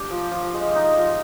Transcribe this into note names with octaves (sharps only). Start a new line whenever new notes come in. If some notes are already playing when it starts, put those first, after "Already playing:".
Already playing: D4 G4
F3
F3
G#3
D#4
F3